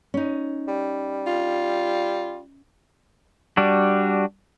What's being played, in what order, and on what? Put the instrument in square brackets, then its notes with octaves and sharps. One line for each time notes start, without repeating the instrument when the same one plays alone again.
[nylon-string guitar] C#4 D#4
[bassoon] G3
[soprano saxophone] F4
[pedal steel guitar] G3 D4 F#4